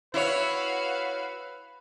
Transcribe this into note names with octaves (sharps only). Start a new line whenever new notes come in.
E4 F#4 B4 C#5 F5